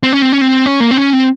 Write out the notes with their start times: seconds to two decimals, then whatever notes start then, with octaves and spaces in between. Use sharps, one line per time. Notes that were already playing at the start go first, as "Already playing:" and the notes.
0.03 C4
0.13 C#4
0.22 C4
0.32 C#4
0.41 C4
0.66 C#4
0.80 A#3
0.91 C4
0.97 C#4
1.13 C4